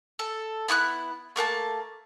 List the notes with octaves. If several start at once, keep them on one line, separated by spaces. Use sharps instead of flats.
A4
B3 E4 C#6 F#6
A3 A#3 F#5 A5